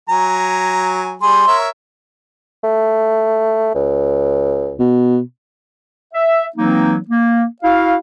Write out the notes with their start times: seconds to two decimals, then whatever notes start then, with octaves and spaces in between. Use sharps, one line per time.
0.09 F#3 G#5 A#5
1.22 G3 G#4 C6
1.48 A#4 C#5 E5
2.63 A3
3.75 C#2
4.79 B2
6.14 E5
6.56 E3 F#3 A#3 C4 D#4
7.09 A#3
7.63 E4 F#4 F5